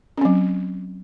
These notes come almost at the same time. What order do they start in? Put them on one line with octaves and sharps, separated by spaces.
C#4 C4 F#3